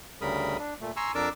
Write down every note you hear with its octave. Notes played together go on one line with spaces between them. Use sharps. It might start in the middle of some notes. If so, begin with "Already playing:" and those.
D2 C#3 G3 A#4 B5 D#6
D4
A#2 A3
G#5 A#5 C6 C#6 E6
F2 D4 A#4 A5 D6 E6